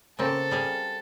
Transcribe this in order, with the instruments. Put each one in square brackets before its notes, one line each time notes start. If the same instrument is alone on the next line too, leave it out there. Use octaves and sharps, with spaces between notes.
[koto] C#3 A#3 C4 [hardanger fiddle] A4
[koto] G3 G#4 F5